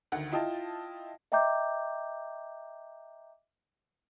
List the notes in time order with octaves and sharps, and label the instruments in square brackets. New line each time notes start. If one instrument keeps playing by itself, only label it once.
[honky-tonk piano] D2 D#3 F#5
E4 F4 D#5 G5 A5
[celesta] D#5 E5 G5 A#5 D6 G6